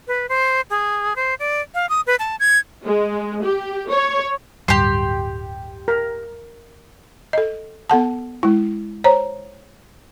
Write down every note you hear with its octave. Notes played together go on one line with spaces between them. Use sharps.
B4
C5
G#4
C5
D5
F5
D#6
B4
A5
G#6
G#3
G4
C#5
D1 G2 G3 G4 C6
A#4
A4 D#5
B3 A4 F#5 A5
G#3 E4
C5 C#5 A#5